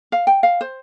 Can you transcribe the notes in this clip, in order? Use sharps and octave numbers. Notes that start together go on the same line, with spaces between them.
F5
G5
F5
C5